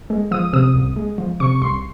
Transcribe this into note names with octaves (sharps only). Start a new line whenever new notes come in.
G#3
F3 D#6
C3 D#6
C2
G#3
F3
C3 C#6
C2 C6